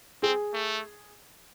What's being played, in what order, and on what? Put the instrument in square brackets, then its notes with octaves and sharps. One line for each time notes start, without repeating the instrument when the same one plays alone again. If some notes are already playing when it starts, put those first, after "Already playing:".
[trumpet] C4 [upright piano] G#4
[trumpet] A3